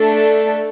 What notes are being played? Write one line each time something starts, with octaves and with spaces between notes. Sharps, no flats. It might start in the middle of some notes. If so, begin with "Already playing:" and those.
Already playing: A3 D4 A4